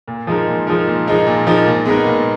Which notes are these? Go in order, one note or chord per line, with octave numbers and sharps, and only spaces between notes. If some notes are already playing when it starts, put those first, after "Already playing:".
A#2
F3 G#3 D#4 A#4
A#2
F3 G#3 D#4 A#4
A#2
F3 G#3 D#4 A#4
A#2
F3 G#3 D#4 A#4
A#2
G#3 B3 D#4 A#4
A#2